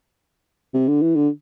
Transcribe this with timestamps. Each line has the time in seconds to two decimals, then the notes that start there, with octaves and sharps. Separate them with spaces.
0.74 C3
0.88 D3
1.02 E3
1.16 D3